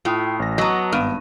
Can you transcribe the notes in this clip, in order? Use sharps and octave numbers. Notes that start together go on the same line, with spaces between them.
A2 F4 G5 D#6
A1 A#6
F#3 B3 D#5 A5 A#5
G#1 G2 B3 D#7